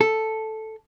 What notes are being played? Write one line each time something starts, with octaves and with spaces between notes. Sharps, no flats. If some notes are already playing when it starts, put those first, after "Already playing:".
A4